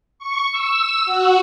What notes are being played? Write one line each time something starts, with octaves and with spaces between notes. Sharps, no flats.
C#6
E6
F#4